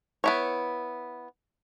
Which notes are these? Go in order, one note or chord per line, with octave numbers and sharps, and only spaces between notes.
B3 E4 C#5